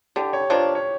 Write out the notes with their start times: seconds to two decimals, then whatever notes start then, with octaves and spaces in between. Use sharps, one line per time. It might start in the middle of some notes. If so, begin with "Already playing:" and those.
0.16 D3 G4
0.33 C#5
0.50 F3 A#3 D4 C#5
0.75 C#5